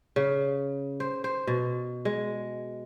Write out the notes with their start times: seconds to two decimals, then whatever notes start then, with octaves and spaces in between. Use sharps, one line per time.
0.16 C#3
1.00 C5
1.24 C5
1.47 B2
2.05 G#3